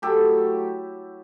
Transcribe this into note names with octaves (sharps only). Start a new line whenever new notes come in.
A2 F#3 G4 A4